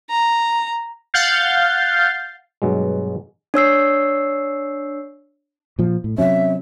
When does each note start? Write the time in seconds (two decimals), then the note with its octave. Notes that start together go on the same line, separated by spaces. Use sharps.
0.10 A#5
1.14 F5 F#5 F6 G6 A6 C7
2.62 G2 B2 F#3 G#3
3.54 D4 C#5 E6 C7
5.79 A#2 F3
6.04 A2
6.18 C3 F#3 C#4 E5